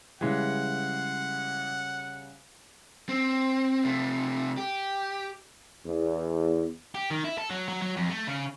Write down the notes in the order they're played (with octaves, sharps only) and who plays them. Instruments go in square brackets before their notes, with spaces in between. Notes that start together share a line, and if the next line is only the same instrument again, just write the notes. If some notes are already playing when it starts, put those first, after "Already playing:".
[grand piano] C#3 G3 [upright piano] E3 G#3 [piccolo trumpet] F#5
[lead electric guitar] C4
C3 A3
G4
[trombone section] E2
[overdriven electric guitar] G4
D#3
E4
A4
F#3
F#3
F#3
F2
A3
C#3